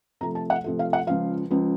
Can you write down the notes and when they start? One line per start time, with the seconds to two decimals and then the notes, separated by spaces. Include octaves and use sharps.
0.21 C3 F3 A3 A#5
0.35 A5
0.50 F#5
0.64 C3 F3 A3
0.79 F5
0.93 F#5
1.07 C#2 C#3 F3 F5
1.51 C#2 C#3 F3